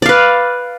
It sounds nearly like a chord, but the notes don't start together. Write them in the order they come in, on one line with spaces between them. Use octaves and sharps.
D5 F5 B4